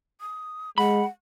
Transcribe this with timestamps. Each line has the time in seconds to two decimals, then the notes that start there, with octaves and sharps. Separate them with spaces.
0.21 D#6
0.78 G#3 F#5 B5